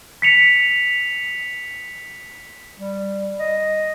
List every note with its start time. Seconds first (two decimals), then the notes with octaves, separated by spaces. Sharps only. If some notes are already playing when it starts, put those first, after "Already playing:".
0.22 B6 C#7 F7
2.79 G3
3.39 D#5